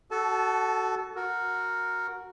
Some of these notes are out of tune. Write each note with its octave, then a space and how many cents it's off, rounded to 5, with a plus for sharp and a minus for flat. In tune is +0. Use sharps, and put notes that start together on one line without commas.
F#4 +20 A4 +0 A5 -30
F#4 -10 A#4 +0